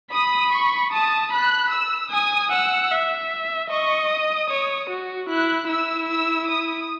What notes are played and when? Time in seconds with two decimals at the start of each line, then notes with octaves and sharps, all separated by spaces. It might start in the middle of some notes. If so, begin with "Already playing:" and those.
0.13 B5 D#6
0.52 C#6
0.92 A5 D#6
1.32 B5 F#6
1.72 E6
2.11 G#5 D#6
2.51 F#5 E6
2.91 E5
3.70 D#5 C#6
4.10 D#6
4.50 C#5
4.90 F#4
5.28 E4 F#6
5.69 E4 E6
6.08 E6
6.48 D#6